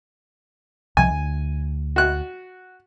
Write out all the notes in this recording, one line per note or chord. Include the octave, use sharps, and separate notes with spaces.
C2 C3 F3 G#5
D2
F#4 F#6